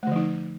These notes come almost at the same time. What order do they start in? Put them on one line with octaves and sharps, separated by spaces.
A3 D3 F3 D#4